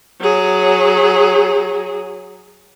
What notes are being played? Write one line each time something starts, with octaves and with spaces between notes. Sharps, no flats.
F#3 G#4